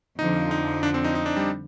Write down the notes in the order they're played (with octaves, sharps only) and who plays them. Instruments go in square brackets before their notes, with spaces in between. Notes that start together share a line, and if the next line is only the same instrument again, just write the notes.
[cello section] F2 D3 F3 [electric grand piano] D#4
[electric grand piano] D#4
D4
C4
D#4
D#4
D4
G3